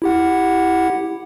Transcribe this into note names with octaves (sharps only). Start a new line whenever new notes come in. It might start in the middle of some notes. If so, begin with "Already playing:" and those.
E4 G4 F#5